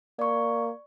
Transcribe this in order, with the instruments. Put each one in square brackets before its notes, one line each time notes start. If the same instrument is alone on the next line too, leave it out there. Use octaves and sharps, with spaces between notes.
[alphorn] A#3 [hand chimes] D5 C#6